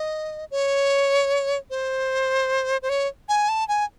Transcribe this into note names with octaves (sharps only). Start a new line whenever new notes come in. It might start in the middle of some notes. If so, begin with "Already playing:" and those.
Already playing: D#5
C#5
C5
C5
C#5
G#5
A5
G#5